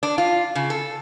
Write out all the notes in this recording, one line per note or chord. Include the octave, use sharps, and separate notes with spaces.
D4
F4
C#3
A4